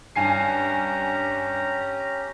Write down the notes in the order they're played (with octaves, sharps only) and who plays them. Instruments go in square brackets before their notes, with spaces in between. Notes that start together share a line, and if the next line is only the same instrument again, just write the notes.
[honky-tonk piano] G2 G#5 C7 [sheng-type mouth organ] C#4 G4 A#5